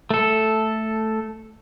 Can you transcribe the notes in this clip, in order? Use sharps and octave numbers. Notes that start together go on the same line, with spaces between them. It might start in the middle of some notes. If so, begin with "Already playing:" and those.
A3 A4